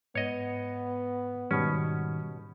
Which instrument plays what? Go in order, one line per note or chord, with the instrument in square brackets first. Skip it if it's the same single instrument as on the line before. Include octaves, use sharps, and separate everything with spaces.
[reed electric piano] G#2 [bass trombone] B3 [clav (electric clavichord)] C#5 D#5
[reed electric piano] G#2 D#3 G3 [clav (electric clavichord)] B2 C#4